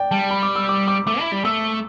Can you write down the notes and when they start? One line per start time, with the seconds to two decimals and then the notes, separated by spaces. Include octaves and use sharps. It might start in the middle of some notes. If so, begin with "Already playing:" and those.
Already playing: D5 G5
0.11 G3 A5
0.30 B5
0.43 D6
0.56 E6
0.69 D6
0.88 D6
1.07 A3 D6
1.20 E4
1.32 G3
1.44 A3 E6